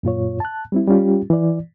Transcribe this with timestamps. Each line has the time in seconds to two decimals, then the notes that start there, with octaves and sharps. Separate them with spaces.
0.03 F#2 A#2 F4 C#5
0.40 A5 F#6
0.72 G3 C4 E4
0.88 G3 C#4 F4 G4
1.30 E3 D5